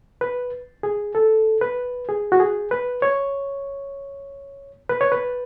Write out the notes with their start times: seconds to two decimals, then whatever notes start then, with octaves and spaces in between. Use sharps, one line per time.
0.21 B4
0.83 G#4
1.15 A4
1.61 B4
2.09 G#4
2.32 F#4
2.40 G#4
2.71 B4
3.02 C#5
4.89 B4
5.01 C#5
5.12 B4